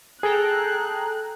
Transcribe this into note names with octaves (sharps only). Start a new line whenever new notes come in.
G#4 A4 G5 A#5 F#6